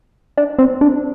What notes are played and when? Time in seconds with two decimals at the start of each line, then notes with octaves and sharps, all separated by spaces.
0.37 D4
0.59 C4
0.81 D4